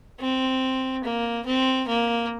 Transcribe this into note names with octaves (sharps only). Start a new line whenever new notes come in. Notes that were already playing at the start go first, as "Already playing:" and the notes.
C4
A#3
C4
A#3